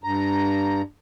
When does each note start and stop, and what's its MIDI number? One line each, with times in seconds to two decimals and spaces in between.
0.04 0.82 43
0.04 0.82 82